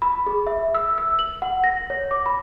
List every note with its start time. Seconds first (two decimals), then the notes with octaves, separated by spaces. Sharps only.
0.02 B5
0.27 G#4
0.47 E5
0.75 E6
0.98 E6
1.19 F#7
1.42 F#5
1.64 A#6
1.90 C#5
2.11 D6
2.26 B5